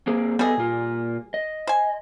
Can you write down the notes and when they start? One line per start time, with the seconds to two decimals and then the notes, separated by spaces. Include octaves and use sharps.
0.07 A#3 C4 G#4
0.39 G3 B3 G#4 A4 D#5
0.58 A#2 F4
1.34 D#5
1.67 C5 G#5